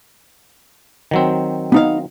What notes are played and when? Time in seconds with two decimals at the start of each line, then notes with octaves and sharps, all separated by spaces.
1.11 D#3 F#3 C4
1.72 B3 D#4 F5